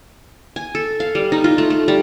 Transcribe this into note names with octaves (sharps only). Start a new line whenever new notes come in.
G#5
A4
F5
G3
D#4
F4
A3
A3
G3